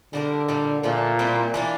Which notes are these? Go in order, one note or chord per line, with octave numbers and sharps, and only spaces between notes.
D3 G3 D4 G4 A#4
A#2 G3 A#3
A#2 D3 F3 A3
G3 C4 E4 G4
E3 A#3 D4